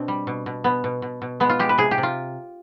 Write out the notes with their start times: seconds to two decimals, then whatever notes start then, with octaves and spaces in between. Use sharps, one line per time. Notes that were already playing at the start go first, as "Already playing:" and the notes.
Already playing: B2 C4 D4
0.08 G3
0.27 B2
0.46 B2
0.64 B2 B3
0.84 B2
1.02 B2
1.22 B2
1.40 G#3 B3
1.49 F4
1.59 G#3 G4
1.69 B4
1.78 C3 G#4
1.91 G4
1.98 C3
2.03 F4